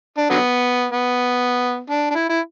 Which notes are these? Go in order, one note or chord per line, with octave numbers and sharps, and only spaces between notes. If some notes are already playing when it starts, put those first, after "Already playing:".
D4
D3 F#3 B3
B3
D4
D4
E4
E4